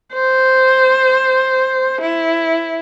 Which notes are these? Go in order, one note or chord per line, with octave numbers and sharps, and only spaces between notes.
C5
E4